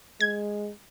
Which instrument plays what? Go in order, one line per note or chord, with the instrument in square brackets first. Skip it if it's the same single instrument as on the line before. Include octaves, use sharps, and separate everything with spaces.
[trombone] G#3 [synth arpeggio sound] G#6